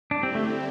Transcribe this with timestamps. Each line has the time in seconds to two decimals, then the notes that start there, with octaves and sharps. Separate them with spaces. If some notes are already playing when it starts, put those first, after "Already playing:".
0.10 D3 G3 D4 E4 G4
0.23 C4
0.35 A3
0.47 C4